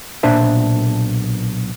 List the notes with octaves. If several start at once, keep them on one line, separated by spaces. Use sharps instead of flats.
B1 A#2 D4 C5 E5